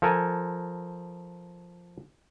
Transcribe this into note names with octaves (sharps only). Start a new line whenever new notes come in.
F3 A4 A#4 G#5